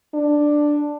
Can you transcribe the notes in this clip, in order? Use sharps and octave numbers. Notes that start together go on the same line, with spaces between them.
D4